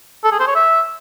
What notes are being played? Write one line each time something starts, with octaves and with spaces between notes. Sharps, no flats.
A4
G#4
C5
C#5
E5